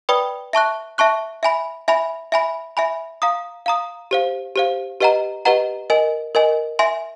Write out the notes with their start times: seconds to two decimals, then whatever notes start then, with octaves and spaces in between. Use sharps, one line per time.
0.09 B4 D5 G5 B5 D#6
0.53 E5 A5 C#6 F#6
0.98 E5 A5 C#6 F#6
1.43 E5 G#5 B5
1.88 E5 G#5 B5
2.32 E5 G#5 B5
2.77 E5 G#5 B5
3.22 F5 A#5 D#6
3.66 F5 A#5 D#6
4.11 G4 C5 F5
4.56 G4 C5 F5
5.01 G4 B4 D#5 F#5 A#5
5.45 G4 B4 D#5 F#5 A#5
5.90 A#4 D#5 G#5
6.35 A#4 D#5 G#5
6.79 E5 G#5 C6